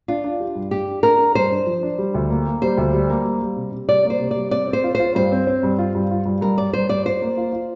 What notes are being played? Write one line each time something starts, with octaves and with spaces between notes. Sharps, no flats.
D4 F4
D4
G4
G2
D4 G4
D4
D4 A#4
D4
G2 C5
D4
F3
D4
G3
D2
A#3
A#3
G3 C5
D2
G3
A#3
G3
G3
C3
C3
G3 D5
A#3
C5
C3
G3 D5
C4 D5
C4
C5
F4
F4 C5
G2 C5
C4
C4
G2
F4
G2
F4
G2
G2 A#4
G3 D5
G2 C5
G3 D5
F4 C5
A#3
F4
F4